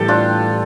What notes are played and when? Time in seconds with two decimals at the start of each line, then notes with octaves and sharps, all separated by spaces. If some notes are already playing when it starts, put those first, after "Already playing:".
Already playing: A2 E3 G3 G4 A4
0.08 D4 F4